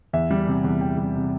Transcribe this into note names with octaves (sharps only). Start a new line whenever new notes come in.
E2 E5
G3
C3
E2
E2 G5
G3
C3